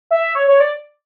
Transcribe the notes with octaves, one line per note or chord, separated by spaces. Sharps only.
E5
C#5
C#5
D5